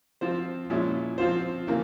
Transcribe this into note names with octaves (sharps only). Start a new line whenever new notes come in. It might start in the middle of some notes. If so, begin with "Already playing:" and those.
F3 C4 F4 C5
A#2 F3 G#3 C#4 E4
F3 C4 F4 C5
C#3 E3 A#3